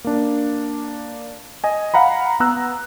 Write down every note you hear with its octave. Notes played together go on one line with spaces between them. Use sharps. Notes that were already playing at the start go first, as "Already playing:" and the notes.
A#3 D4
D#5 G#5
F5 F#5 A#5 B5
B3 A#5 E6 F#6